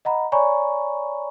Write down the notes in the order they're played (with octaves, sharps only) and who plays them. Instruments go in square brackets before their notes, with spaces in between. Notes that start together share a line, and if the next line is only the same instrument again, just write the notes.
[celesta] D#5 F#5 A#5 B5
C#5 D5 G#5 A#5 B5 C#6